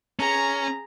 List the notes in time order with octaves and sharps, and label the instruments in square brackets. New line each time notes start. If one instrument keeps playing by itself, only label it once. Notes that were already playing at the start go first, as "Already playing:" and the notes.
[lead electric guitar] C#4 [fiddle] G#4 A#5